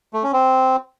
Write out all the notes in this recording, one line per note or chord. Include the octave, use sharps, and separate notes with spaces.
A3
C#4
C4